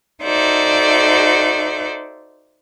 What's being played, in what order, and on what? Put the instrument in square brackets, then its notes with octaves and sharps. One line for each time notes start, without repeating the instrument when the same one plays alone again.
[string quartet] D#4 F#4 A4 C5 D5 E5